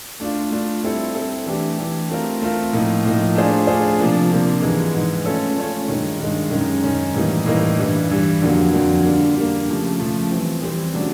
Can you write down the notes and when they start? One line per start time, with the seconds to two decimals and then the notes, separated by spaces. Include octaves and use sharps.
0.20 A3 D4 F4
0.51 A3 D4 F4
0.83 G3 C4 E4 A4
1.14 G3 C4 E4 A4
1.46 E3 A3 D4 G4
1.78 E3 A3 D4 G4
2.09 A3 C4 F4 A#4
2.41 A3 C4 F4 A#4
2.73 A2 F3 A#3 D#4
3.05 A2 F3 A#3 D#4
3.35 A3 D4 F4 G#4 C5
3.67 A3 D4 F4 G#4 C5
3.99 C3 F3 A#3 D4
4.31 C3 F3 A#3 D4
4.62 G#2 E3 G#3
4.94 G#2 E3 G#3
5.25 A3 C#4 F4 A4 C#5
5.56 A3 C#4 F4 A4 C#5
5.88 G2 D#3 G#3
6.20 G2 D#3 G#3
6.51 F#2 D#3 G#3 C#4
6.83 F#2 D#3 G#3 C#4
7.14 A2 E3 G3 A#3 D#4
7.46 A2 E3 G3 A#3 D#4
7.79 G2 E3 G3
8.10 G2 E3 G3
8.42 F2 D3 F#3 A#3
8.73 F2 D3 F#3 A#3
9.04 D3 G3 A#3
9.36 D3 G3 A#3
9.68 C#3 F3 A3
9.99 C#3 F3 A3
10.31 E3 G3 C4
10.62 E3 G3 C4
10.93 C#3 F#3 A3 D4